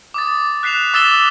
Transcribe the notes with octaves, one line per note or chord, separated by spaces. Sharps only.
D6 D#6 A6
F#6 B6 C7 E7 F7
D6 E6 A6 B6 E7 G7